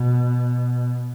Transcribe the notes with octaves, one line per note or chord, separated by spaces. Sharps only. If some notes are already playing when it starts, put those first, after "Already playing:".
Already playing: B2